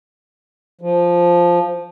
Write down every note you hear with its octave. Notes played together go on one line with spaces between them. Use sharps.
F3